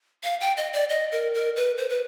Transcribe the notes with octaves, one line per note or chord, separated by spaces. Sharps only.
F5
G5
D#5
D5
D#5
A#4
A#4
B4
C5
B4